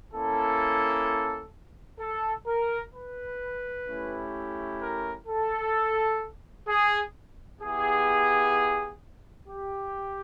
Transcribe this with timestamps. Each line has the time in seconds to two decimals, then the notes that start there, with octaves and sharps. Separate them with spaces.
0.13 A#3 C#4 E4 A4
2.00 A4
2.47 A#4
2.93 B4
3.87 A3 C#4 E4 G4
4.80 A#4
5.28 A4
6.68 G#4
7.61 B3 E4 G4 G#4
9.49 G4